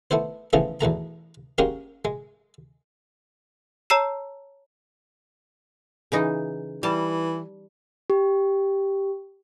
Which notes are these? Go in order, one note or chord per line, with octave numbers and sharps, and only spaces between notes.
A3 B3 E4 C5
C#3 E3 F3 A3 B3
E2 B2 A3 A#5
G#3 A#3 C#4 F#4 G4 A#4
G#3
C#5 A5 A#5 E6 C7 E7
C#3 E3 D#4
E3 G3 A5
G4